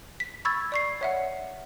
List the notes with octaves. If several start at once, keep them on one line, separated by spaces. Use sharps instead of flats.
B6
B5 C#6 E6 G#6 A6
D5 C#6 C7
C#5 E5 F#5